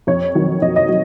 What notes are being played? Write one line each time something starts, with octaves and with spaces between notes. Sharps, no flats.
F2 C#5
D#3 F#3
F2 D#5
D#5
F#3